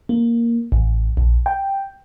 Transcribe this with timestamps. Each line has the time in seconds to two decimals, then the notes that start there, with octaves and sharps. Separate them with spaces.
0.09 A#3
0.72 A1
1.17 A#1
1.46 G5